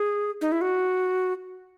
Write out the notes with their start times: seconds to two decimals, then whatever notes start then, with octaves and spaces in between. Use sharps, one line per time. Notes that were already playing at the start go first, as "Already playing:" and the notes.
Already playing: G#4
0.41 D#4
0.52 E4
0.61 F#4